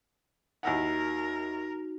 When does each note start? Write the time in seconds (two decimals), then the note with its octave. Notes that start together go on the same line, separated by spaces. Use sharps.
0.63 D#2 D#4 E4 F#4 A#4 F#5